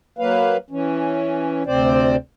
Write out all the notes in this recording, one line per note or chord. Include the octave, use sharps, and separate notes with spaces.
F#3 A#3 B4 F5
E3 C#4
D2 C3 C4 C5 D5